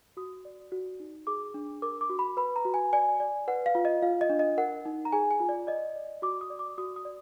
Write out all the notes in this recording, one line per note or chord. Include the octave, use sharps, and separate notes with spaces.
F#4 D#6
D5
F#4
D#4
G#4 D6
D4
A#4 D6
D6
F#4
B5
B4 B5
A#5
F#4
G#5
D5 G#5
D5
B4 F#5
F5
F4
D#5
F4 F5
D#5
D4
D#5
A#4 F#5
D#4
A#5
G#4 G#5
G#5
F4
D5
D5 D#5
D5
F#4 D6
D#6
D5
D6
F#4 D#6
D#6
D5